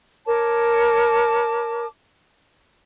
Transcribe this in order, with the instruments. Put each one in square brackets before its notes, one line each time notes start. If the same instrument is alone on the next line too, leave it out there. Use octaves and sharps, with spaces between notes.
[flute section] A#4 C#5 A5 D6